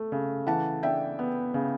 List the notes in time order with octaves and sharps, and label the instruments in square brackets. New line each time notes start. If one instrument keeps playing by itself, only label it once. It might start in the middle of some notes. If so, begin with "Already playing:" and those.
Already playing: [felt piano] A3
C#3
E3 F#5 A5
D4 E5 G5
B3
C#3